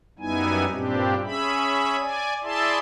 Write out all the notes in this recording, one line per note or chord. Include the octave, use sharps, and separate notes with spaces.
F#2 G3 B3 D#4 E4 G#5
G2 A#2 G3 C4 D4 G4
C#4 G#4 E5 B5
D5 G#5
E4 G#4 D5 E5 A5 C6